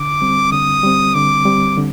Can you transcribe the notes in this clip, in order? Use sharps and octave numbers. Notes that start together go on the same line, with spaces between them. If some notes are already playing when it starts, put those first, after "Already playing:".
Already playing: D3 D6
G3 C4
D3 D#6
G3 C4
D3 D6
G3 C4
D3